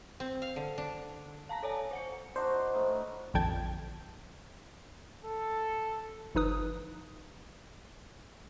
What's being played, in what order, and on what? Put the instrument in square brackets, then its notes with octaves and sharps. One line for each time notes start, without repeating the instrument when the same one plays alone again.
[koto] C4
F5
D3
D4
[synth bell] F5 A5 A#5 A#6
A4 C#5 D5 G#5 A5
C5 F#5 C#7
[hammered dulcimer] D4 D#4 F#4 [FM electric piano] C5
[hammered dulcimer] A2 D#4 E4
[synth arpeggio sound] A#1 F2 D3 G5 A5 G#6
[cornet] A4
[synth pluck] G1 F3 D#4 B4 D#6